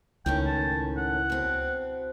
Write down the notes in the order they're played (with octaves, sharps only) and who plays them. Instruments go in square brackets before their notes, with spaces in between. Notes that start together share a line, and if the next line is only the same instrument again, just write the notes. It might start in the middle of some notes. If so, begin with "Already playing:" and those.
[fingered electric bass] C#2 [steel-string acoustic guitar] A2 D#3 C#4 [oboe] G5
[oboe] A5
F#5
[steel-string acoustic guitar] B2 C4